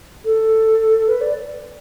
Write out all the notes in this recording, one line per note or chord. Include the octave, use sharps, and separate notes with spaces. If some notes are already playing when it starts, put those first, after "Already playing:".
A4
B4
D5